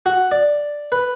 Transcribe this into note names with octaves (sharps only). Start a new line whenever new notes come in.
F#4
D5
B4